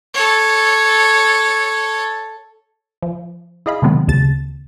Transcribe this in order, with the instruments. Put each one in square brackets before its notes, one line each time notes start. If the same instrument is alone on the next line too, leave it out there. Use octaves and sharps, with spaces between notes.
[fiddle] A4 C#5
[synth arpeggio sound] F3
E4 G#4 D#5 F5 B5
C3 D#3 F#3 G#3 B3 C4
D2 C#3 A5 A6